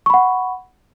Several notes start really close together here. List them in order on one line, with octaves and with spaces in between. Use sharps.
C#6 B5 F#5